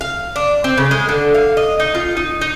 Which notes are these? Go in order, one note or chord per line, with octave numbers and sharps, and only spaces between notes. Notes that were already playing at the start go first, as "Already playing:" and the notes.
F5
D4
C4
C#3
G#3
D3
F5
D#5
D#4
F4
D#4
D#4